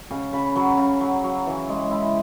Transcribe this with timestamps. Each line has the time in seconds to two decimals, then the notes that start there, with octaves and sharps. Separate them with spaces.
0.10 C#3 G#5
0.33 C#3 B5
0.55 F#3 B5
0.77 C#3
1.00 F#3
1.24 F#3
1.46 E3
1.69 G#3
1.91 E4